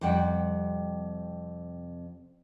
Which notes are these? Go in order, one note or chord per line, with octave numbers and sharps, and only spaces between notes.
F2 C3 G3 F#5 G5